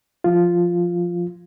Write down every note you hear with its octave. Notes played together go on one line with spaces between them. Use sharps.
F3 F4